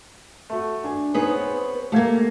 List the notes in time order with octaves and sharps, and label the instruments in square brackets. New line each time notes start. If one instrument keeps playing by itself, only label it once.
[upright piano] A3 F#4
D4 G#5
[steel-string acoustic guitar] B3 B4 C#5 [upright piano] C4 D#4 G#4
[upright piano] C4
[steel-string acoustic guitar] A3 A#3 [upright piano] G4 F5 G#6